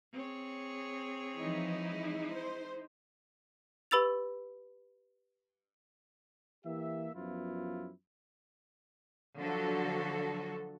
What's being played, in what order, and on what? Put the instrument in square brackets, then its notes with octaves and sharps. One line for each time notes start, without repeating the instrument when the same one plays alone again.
[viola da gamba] C4 G#4 C#5
[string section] E3 F3 [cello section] G#3 D#4 E4
[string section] C5
[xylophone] G4 B4 B5 E6 A6 F7
[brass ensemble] E3 A#3 G4 E5
F#2 F3 B3 E4 F4
[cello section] D3 F3 F#3 F#4 A4